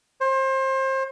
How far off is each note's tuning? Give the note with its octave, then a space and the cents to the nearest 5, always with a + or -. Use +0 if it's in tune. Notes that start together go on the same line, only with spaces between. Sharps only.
C5 +30